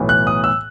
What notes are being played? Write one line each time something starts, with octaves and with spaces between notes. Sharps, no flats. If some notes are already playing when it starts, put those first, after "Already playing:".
Already playing: B1 A2 E3 B3
F#6
D#6
E6